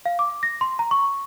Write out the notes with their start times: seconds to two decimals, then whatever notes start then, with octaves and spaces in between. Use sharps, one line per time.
0.06 F5
0.19 D6
0.43 A#6
0.61 C6
0.79 A#5
0.91 C#6